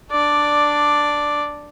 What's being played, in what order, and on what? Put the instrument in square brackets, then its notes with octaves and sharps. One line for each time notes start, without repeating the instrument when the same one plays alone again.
[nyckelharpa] D4 D5